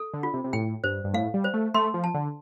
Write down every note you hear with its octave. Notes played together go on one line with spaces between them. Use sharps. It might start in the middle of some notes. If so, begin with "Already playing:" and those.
Already playing: A4
D3
F4
C3
C3
A2 G5
G2 C5
G2
A2 F5
G3
C5
A3
A3 C6
F3
A5
D3